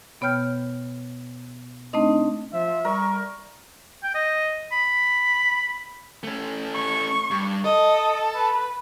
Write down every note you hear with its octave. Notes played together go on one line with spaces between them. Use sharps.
B2 B3 C#5 G5 F6 G6
A3 C4 D4 D#4 D#5
F3 F4 E5
G3 A#4 C#6
G5
D#5
B5
A3 C#4
C#6
G2
A4 D#5
B4